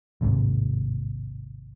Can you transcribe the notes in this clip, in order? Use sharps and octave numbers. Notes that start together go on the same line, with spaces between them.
A1 D#2 G#2 C3